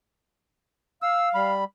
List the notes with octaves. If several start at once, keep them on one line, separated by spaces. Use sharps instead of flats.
F5 E6
G3 B5